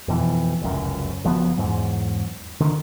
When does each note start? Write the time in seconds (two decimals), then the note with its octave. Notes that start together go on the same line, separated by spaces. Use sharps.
0.08 F2 B2 E3
0.61 F1 C#2 F#2
1.24 F#1 F3 F#3 B3
1.57 E2 G#2 F#3
2.60 D3 D#3